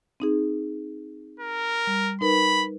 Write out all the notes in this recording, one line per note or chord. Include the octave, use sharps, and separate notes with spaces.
C4 D#4 G#4
A#4
G3
D#4 A#4 B4 B5